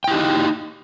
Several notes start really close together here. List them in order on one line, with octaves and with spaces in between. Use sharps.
G5 E4 G4 D#4